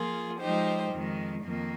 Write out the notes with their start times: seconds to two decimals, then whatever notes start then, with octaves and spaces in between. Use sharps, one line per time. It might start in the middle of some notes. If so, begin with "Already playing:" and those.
Already playing: F3 A#3 F4 G#4
0.40 F3 G#3 D#4 G4 C5
0.93 F2 D#3 G#3
1.44 F2 D#3 A#3